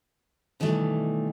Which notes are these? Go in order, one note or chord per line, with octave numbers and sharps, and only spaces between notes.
B2 D#3 E3 G3 A3